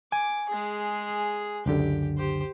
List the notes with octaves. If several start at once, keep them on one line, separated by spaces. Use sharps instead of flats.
G#5 D6
G#3 G#4
C#2 F#2 D3 G4
G4 C5